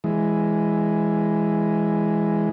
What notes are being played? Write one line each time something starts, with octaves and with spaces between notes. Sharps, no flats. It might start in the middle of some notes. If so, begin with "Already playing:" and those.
E3 G#3